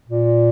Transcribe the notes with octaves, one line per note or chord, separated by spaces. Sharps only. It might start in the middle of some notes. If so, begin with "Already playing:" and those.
A#2